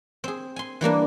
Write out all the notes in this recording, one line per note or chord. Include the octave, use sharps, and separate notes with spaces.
C4 G#4
G#5 C6
E3 G3 A#3 D4